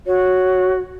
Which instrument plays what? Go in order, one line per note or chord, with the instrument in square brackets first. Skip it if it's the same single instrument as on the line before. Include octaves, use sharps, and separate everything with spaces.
[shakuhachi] F#4 [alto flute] C#5